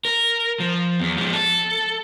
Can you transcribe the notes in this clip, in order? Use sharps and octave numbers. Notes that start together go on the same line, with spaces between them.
A#4
F3
E2
F3 G#3
A4